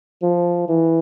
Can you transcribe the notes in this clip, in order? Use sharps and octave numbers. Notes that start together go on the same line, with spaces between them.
F3
E3